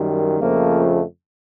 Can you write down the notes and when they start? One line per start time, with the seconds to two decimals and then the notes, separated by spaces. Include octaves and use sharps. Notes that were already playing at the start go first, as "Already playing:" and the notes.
Already playing: F#2 D#3 G3
0.39 F2 C#3 F3 A3 A#3